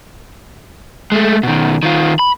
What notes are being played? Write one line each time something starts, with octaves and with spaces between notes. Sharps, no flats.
G#3 A3
B2 D#3
D#3 F4
B5